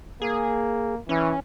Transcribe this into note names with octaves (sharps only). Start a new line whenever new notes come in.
A#3 G#4
E3 C#4